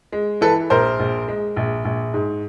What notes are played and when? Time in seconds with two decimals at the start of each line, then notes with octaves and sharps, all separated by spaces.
0.12 G#3
0.41 E3 A4 B4
0.70 A#1 A#4 C5
0.99 A#1
1.28 G#3
1.56 A#1
1.85 A#1
2.14 G#2